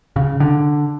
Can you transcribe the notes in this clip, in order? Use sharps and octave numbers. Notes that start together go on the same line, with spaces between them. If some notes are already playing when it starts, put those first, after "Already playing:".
C#3
D3